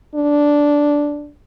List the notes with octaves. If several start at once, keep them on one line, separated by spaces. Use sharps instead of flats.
D4